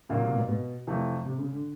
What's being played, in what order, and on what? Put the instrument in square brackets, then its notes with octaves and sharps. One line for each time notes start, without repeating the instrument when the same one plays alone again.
[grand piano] B1 A#2 F#3 A#3 [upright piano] C#3
[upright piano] C3
B2
B2
[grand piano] F2 C3 E3 A3
[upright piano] C3
C#3
D3